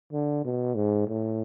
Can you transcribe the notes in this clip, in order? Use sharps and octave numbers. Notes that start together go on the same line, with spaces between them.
D3
B2
G#2
A2